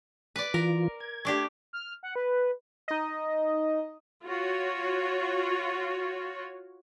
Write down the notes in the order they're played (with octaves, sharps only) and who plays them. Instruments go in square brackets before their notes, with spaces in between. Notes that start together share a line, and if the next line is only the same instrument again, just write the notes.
[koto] B4 D5
[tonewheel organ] E3 F4 [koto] A#4
[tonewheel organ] G#6
[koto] A3 D4 G4
[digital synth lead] F6
F#5
B4
[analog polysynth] D#4 D#5
[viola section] F4 F#4 C#5